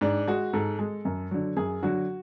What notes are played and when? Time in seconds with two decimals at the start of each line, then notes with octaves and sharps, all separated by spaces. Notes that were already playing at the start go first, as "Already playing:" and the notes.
0.01 G#2 D4
0.28 G#3 F#4
0.53 G#2 A4
0.79 G#3
1.05 F#2
1.31 D3 F#3
1.56 F#2 G#4
1.83 D3 F#3 F#4